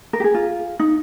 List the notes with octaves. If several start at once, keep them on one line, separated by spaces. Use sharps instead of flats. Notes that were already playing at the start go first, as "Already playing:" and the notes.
A#4
G4
G#4
F4
D#4